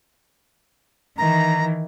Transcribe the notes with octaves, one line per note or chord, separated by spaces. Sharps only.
D#3 E3 A#5